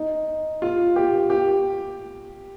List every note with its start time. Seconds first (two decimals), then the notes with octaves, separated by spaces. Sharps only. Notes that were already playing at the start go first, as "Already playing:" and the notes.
Already playing: D#4
0.62 F4
0.96 G4
1.30 G4